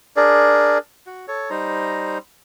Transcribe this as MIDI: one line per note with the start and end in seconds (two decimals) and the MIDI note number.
0.17 0.78 62
0.17 0.78 68
0.17 0.78 70
0.17 0.78 74
1.07 1.26 66
1.28 1.50 69
1.28 1.50 73
1.50 2.18 55
1.50 2.18 63
1.50 2.18 72
1.50 2.18 82